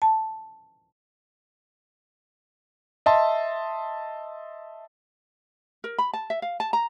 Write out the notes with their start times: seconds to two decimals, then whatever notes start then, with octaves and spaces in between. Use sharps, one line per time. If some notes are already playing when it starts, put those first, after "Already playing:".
0.02 A5
3.06 D#5 E5 A5 C6
5.84 A#4
5.98 B5
6.13 A5
6.30 E5
6.42 F5
6.60 A5
6.73 A#5